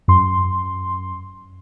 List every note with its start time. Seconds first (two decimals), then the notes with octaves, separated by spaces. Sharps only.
0.08 F#2 C6